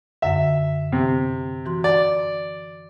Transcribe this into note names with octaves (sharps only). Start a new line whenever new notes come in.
F#2 D3 E5 F#5
C3
E3 F#4 C6
D5